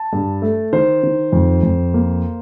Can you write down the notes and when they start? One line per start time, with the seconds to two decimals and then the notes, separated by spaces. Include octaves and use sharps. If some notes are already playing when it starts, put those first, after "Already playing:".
Already playing: A5
0.13 G2
0.42 A3
0.73 D#3 C5
1.03 D#3
1.33 F2
1.63 F2
1.94 A#3